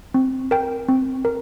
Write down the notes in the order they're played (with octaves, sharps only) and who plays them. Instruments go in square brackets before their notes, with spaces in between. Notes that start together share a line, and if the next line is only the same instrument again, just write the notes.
[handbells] C4
A#4 G5
C4
A#4